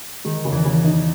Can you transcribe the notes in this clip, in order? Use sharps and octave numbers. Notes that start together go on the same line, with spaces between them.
D#3 G#3
C#3
E2 E3
C#3
D#4